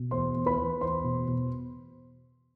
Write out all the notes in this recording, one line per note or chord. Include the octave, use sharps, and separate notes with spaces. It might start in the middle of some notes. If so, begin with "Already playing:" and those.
Already playing: B2
E2 C5 C6
E2
B4 B5
E2
E2 C5 C6
B2
B2